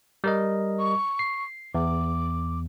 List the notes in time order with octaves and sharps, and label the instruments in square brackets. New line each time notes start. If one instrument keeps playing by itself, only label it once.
[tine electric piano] G3 A#4 D#5
[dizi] C#6
[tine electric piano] C7
[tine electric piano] E2 [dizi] D6